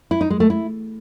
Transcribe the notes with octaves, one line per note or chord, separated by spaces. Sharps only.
E4
D#4
G#3
A3
E4